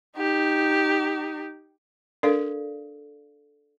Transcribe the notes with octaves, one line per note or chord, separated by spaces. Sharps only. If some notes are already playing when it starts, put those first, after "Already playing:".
D#4 G4
D4 A4 A#4 D5 F5